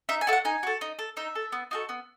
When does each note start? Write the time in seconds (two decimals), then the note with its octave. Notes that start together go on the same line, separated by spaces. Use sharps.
0.09 D#4 E5
0.21 G#5
0.27 F#4 A4 E5
0.33 F#5
0.45 D#4 G#5
0.63 F#4 A4
0.81 D#4
0.99 A4
1.17 D#4 E5
1.35 A4
1.52 B3
1.71 D#4 F#4 A4
1.89 B3